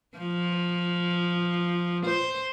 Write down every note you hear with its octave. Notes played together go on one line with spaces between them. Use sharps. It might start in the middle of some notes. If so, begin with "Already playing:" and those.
F3
C5